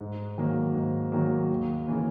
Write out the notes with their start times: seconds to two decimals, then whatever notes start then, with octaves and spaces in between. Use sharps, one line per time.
0.01 G#2
0.38 D#3 F#3 A#3
0.74 G#2
1.12 D#3 F#3 A#3
1.50 D#2
1.87 C#3 E3 A#3